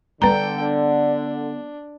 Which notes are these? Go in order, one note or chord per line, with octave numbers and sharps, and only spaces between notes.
D3 G3 B3 A4 B4 G5 A#5
D4